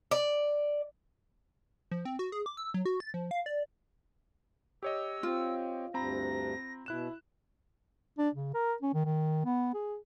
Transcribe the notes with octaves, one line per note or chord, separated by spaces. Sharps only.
D5
F3
C4
F#4
G#4
D6
E6
F#3
F#4
A6
F3
F5
D5
G4 C#5 D#5 E6
C4 F4
D2 G2 C4 A#5 B5 A#6
B2 E4 F#6 E7
D4
C#3
A#4
C#4
D#3
D#3
B3
G#4